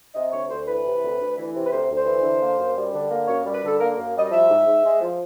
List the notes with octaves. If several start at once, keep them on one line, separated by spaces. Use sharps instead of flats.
C3 D#5
D2 C#5
D2 C5
E3 B4
C3
D2
D2
E3
C3
B4
D2 C5
D2
C5
E3
D3
A#3
F#2
G3
D3
A#3
F#2 C#5
G3
B4
D3 A4
A#3 A#4
F#2
G3 D#5
D#5
F3 E5
G#2
G#2
G#3
F3